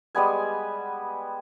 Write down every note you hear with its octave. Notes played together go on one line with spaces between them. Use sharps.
G3 G#3 B3 G#5